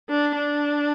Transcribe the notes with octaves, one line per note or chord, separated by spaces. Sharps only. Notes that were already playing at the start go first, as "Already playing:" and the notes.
D4
D4